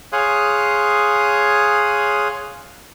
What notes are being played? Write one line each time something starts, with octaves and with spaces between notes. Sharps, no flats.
G#4 C#5 F5 C6 D#6 F#6